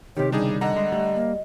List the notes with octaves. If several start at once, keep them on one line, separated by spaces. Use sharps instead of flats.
C3 D#3 G4 C#5
C#3 G3 D4 D#4 G#4
D3 D#5 F#5 A#5
G#3
G3 A3
A#3